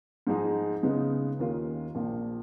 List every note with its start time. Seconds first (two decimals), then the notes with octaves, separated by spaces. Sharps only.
0.27 G#2 F3 G#3 D#4 G#4
0.83 C#3 G#3 B3 D#4
1.39 D#2 D#3 A#3 C#4 F4
1.95 A#1 A#2 F3